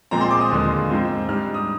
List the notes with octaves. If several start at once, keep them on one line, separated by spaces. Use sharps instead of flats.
A#2 F3 G#3 C4 A#5
C6
D6
D#6
D#2 D3 F3 G#3
G#2 F3 C4
G#2 G3 D4 F6
D#6